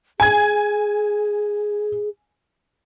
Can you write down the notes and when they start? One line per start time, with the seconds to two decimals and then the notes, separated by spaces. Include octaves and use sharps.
0.20 G#4 G#5 G#6